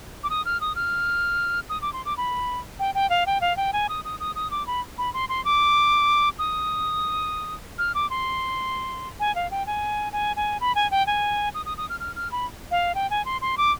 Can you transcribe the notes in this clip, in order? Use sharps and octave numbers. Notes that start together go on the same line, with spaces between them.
D6
D#6
F6
D#6
F6
D#6
D6
C6
D6
B5
G5
G5
F5
G5
F5
G5
G#5
D#6
D#6
D#6
D#6
D6
B5
B5
C6
C6
D6
D#6
F6
D6
C6
G#5
F5
G5
G#5
G#5
G#5
B5
G#5
G5
G#5
D#6
D#6
D#6
F6
F6
F6
B5
F5
G5
G#5
C6
C6
D6